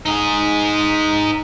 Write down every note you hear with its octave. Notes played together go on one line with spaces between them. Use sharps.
D#4 G#4